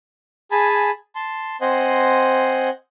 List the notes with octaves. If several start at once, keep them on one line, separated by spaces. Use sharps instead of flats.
G#4 G#5 A5 B5
A5 C6
C4 C5 D#5 F#5 G#5 C6